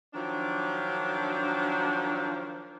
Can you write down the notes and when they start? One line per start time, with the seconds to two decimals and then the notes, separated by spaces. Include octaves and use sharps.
0.14 D#3 F3 F#3 D4